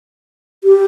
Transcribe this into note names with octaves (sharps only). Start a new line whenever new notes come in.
G4